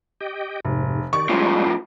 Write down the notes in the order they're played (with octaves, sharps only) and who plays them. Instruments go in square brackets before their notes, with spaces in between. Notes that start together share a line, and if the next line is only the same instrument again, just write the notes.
[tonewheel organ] G4 D#5 G5
[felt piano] F1 [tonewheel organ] G#2 C3
[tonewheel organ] D#3 G4 D5 [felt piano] C#6
[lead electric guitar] A2 F3 [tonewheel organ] G3 G#3 C#4